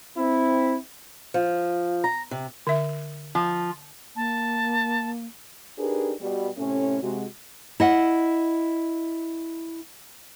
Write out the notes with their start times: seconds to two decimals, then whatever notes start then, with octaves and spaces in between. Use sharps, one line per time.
0.18 C4 E4
1.34 F3
2.04 A#5
2.31 C3
2.67 D3 E5
3.35 F3
4.16 A#3 A5
5.79 D4 D#4 G4 G#4 A#4 B4
6.21 B2 G3
6.57 A2 C3 A3 C#4
7.02 C3 G#3 F#4
7.80 E4 D#5 F#5